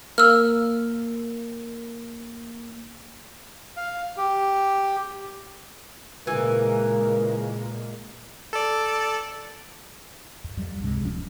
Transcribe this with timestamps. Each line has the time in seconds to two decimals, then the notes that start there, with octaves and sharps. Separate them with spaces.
0.18 A#3 E6 F6
3.77 F5
4.17 G4
6.27 A#2 C#3 E3 G#3 A#3 A#4
8.53 A4 D5
10.44 F2
10.57 F2 F3 G3
10.80 C#2 G2 C3 G#3
11.01 D1 F3 C#4